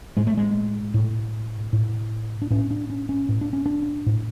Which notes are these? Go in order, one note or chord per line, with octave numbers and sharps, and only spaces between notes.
A2 G#3
A3
G#3
A2
A2
D4
A2 C#4
D4
C#4
C#4
A2
D4
C#4
D4
A2